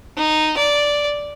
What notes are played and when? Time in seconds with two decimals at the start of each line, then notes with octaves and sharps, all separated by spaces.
0.17 D#4
0.57 D5